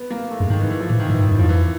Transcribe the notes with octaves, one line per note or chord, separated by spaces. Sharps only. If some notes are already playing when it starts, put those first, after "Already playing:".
Already playing: B3
A#3
A3
F#2 G#3
G2 D#3
E3
E3
F3
A2 E3
D#3
G#2 E3
G2 D#3
F#2 E3
F2 F3
E3